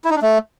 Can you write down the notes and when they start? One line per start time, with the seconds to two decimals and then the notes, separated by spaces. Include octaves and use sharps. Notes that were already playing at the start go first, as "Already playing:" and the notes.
0.05 E4
0.10 D#4
0.16 D4
0.22 A3